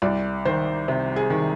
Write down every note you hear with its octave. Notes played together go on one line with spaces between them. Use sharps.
C2 D5
D#3 C5
C3
G#4
D#3